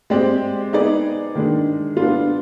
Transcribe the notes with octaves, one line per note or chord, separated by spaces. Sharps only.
G#3 C4 G4 D5
B3 D#4 G#4 D5
D#3 G#3 D4
B3 D4 F4